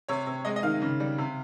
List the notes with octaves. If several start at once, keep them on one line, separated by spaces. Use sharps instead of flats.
C3 C#5
C3
G#3 D#5
D#5
D#3 F5
C#3
G3
C3